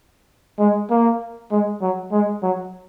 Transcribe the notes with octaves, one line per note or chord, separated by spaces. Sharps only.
G#3
A#3
G#3
F#3
G#3
F#3